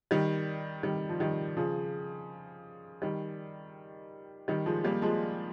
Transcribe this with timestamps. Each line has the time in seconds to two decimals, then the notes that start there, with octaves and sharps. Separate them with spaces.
0.11 D#3 G3
0.83 D#3 G3
1.09 F3
1.20 D#3 G3
1.57 C#3 F3
3.02 D#3 G3
4.48 D#3 G3
4.66 F3 G#3
4.84 G3 A#3
5.02 F3 G#3